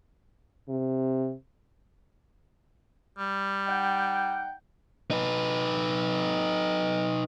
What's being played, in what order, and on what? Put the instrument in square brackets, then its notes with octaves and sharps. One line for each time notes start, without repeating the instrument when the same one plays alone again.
[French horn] C3
[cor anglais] G3
[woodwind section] D#4 F#5 G5
[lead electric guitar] D#4 B4